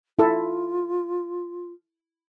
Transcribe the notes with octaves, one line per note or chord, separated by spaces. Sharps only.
E4 F4 A4